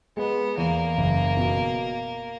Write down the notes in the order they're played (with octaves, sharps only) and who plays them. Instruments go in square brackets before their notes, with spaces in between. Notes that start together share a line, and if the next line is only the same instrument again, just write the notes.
[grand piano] G#3 [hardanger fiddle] B3
[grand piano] E2 [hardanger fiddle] A#3
[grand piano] F#1
B2